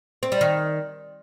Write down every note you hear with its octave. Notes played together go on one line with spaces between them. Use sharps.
C4
G3
D#3